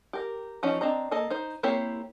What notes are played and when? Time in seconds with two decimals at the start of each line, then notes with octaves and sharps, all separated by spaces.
0.13 G4 A#4
0.63 E3 F3 C#4 D#4
0.81 C4 D4 D#5 A#5
1.11 A#3 A4 D#5
1.30 D#4 C5
1.63 A#3 C4 E4 G4 C#5